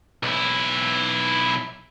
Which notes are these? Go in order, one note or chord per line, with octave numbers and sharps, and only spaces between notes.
B1 E4